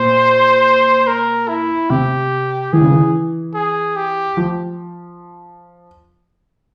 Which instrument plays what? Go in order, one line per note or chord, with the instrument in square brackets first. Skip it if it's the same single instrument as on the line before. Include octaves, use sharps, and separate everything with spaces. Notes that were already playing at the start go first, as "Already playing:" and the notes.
Already playing: [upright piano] A#2 [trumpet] C5
[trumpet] A#4
E4
[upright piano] C3 [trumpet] G4
[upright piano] E3 [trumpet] G#4
[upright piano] C#3
E3
[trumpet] G#4
G4
[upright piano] F3